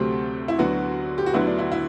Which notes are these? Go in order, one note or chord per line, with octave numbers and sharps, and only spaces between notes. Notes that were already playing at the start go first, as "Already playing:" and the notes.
Already playing: D2 C3 F#3 A3 C4 G4
E4
D2 D3 F#3 B3 F#4
G4
F#4
D2 D3 F#3 B3 E4
D4
E4
E4